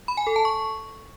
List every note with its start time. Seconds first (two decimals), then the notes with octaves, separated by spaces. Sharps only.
0.08 B5
0.17 G#5
0.27 A4
0.36 A5
0.45 C#6